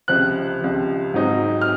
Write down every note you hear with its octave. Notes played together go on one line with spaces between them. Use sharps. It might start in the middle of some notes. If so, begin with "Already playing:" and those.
C#2 C3 F3 F#6
C#2 C3 F3
G#2 F#3 C4 D#4
F6